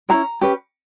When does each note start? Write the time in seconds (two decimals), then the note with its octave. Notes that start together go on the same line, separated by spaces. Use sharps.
0.09 C#4 E4 A#4 A#5
0.41 C#4 G4 B4